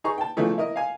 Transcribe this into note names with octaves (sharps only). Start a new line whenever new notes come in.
D#4 G#4 A#5 C#6
G5 A5
C#3 E3 F3 A3 D#4
E4 A#4 D#5
F5 G#5